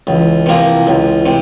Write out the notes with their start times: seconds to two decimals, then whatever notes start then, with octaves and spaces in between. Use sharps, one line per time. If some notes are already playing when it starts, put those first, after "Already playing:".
0.07 C#2 E3
0.46 C3 F3 A#3
0.87 C#2
1.26 C3